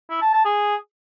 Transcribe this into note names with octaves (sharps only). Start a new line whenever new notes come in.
E4
A5
A5
G#4